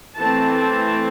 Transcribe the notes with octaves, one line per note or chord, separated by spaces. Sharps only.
E3 A3 C4 A5
A5